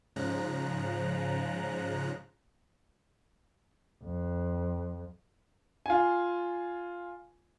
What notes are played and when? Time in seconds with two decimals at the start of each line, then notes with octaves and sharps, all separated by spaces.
0.16 G#2 C#3 F3 A#5 F#6
4.04 F2
5.86 F4 G#5